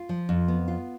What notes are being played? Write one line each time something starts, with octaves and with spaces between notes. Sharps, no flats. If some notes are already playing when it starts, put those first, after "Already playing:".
Already playing: F4
F3
F2
B3
F4